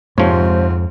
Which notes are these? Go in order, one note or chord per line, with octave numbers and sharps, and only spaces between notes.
F2 G#2 C3 F3 C5 C#5